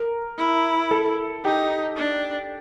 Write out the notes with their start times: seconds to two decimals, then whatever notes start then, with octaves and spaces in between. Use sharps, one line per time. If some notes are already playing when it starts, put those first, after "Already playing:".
Already playing: A#4
0.38 E4
0.91 A4
1.44 D#4 G4
1.97 D4